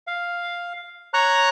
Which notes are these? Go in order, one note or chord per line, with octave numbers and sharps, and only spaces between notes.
F5
C#5 A#5 C#6 F#6